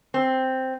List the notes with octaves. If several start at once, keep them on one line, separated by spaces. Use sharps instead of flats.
C4